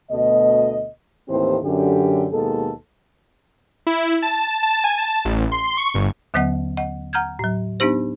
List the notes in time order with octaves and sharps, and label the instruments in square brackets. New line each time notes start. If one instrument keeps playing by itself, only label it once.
[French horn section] D2 B2 A3 D#5
D#2 A2 E3 C4 G4 C5
F#2 D3 G4
D#2 B2 G#3 A4
[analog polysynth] E4
A5
A5
G#5
A5
A1
C6
C#6
G1
[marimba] D#2 D3 F#3 B3 D#5 F#5
D#5 F#5
F#5 A#5 F6 G6 G#6
A2 F#3
B3 D4 D#4 G4 C5